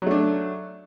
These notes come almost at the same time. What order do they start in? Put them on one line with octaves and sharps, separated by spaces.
F#3 A3 D4